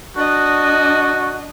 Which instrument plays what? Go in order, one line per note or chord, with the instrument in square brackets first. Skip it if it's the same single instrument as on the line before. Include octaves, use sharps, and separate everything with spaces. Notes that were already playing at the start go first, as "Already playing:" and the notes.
[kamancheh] D4 D#5 [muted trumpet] F#4